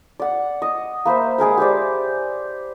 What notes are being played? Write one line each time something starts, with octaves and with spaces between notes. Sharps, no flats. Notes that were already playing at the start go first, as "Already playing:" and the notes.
D5 F#5
D#5
A#3 B4 C5 E5
G#3 G#4 A#4 B4
G4 B4 C5 D5